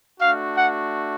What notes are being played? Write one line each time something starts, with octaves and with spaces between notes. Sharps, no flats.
A3 D4 F#4 F5
F#5